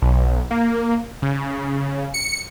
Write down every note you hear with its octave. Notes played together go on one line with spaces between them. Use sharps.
B1
A#3
C#3
C#7